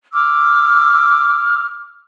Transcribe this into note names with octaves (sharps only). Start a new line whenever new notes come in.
D6 E6 F6